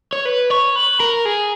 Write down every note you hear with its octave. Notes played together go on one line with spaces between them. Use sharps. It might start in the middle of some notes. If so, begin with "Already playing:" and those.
C#5
B4
C#5
B4
A#4
G#4